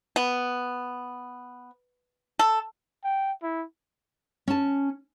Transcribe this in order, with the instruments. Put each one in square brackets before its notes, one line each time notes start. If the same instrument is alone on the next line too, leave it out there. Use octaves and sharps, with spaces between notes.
[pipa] B3
A4
[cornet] G5
E4
[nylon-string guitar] C#4 A5